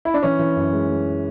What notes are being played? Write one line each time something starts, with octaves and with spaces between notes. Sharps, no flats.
E4
D4
E3 C#4
E3
F#2
G#3
G#3